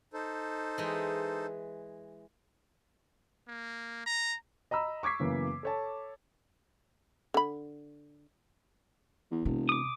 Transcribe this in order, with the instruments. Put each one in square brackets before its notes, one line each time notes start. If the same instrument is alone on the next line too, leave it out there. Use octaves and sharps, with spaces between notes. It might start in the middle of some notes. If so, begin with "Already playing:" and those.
[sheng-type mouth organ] D#4 A4 C5
[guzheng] E3 G#3
[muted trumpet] A#3
A#5
[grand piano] D#5 A#5 B5 E6
C#6 D6 G#6 B6 C7
F#2 C#3 E3 A#3 B3
A4 C#5 A5
[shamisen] D3 B5
[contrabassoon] E2
[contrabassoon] E1 [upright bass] C3
[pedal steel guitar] D6 D#6